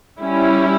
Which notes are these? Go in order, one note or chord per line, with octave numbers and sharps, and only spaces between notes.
G3 C#4 E4